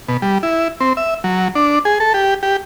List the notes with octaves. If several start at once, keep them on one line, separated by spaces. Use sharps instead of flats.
B2
G3
E4
C4
E5
F#3
D4
G#4
A4
G4
G4